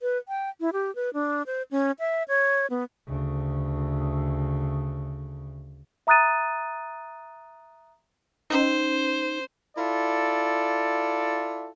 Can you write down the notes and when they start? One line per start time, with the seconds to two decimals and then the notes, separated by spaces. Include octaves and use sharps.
0.01 B4
0.28 G5
0.60 E4
0.73 G4
0.95 B4
1.14 D4
1.46 C5
1.71 C#4
1.99 E5
2.28 C#5
2.70 B3
3.07 D2 C#3
6.07 E5 A#5 D#6 F#6 A6 D#7
8.50 C#4 D#4 A#4 C5
9.76 E4 F4 A4 D5